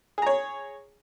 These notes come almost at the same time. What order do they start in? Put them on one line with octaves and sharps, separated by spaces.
G#4 A#5 C#5